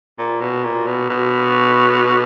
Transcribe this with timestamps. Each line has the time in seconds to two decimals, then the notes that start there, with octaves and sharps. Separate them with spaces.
0.19 A#2
0.41 B2
0.64 A#2
0.87 B2
1.09 B2